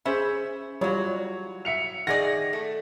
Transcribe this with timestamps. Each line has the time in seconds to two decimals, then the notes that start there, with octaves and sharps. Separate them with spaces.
0.05 C#4 G#4 C5 E5 B5
0.81 E3 F#3 G3 F4 C#5
1.65 E5 C#7 F7
2.07 D#3 G#4 D5 F#5 A#6
2.53 A3